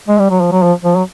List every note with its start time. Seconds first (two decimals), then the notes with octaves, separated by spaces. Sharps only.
0.08 G#3
0.19 G3
0.30 F#3
0.41 F3
0.52 F#3
0.63 F3
0.85 F3
0.96 F#3